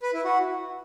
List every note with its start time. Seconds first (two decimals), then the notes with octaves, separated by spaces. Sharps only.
0.03 B4
0.14 E4
0.25 F#4